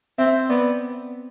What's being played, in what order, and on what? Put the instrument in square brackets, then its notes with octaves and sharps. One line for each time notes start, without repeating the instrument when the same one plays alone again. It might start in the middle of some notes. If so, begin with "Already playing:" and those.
[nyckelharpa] C4 [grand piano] E5
[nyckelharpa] B3 [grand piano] D5